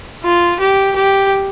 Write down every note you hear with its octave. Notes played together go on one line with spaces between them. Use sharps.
F4
G4
G4